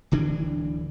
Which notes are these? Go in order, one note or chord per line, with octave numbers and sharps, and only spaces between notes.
D1 D3 E3 D4